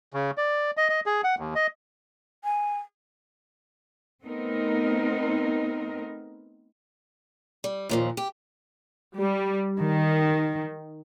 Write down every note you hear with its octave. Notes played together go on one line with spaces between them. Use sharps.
C#3
D5
D#5
D#5
G#4
F#5
D#2
D#5
G#5
A3 B3 C4 D#4 A#4
G3
D#2 A#2 F3
G4
G3
D#3